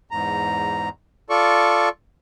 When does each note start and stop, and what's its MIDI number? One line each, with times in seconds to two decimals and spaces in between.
0.11 0.89 40
0.11 0.89 44
0.11 0.89 82
1.30 1.89 65
1.30 1.89 69
1.30 1.89 74
1.30 1.89 85